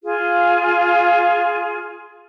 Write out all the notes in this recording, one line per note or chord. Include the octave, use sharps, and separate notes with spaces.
F4 G#4